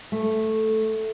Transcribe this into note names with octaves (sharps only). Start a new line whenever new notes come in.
A3